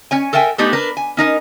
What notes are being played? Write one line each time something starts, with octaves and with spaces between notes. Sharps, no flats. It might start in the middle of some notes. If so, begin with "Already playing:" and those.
C#4 C#5 G#5
A4 A#4 E5 G5 G#5
A3 B3 D4 D#4 G4 G#4
D4 A#4 B4
G#5
C#4 D#4 A#4 D#5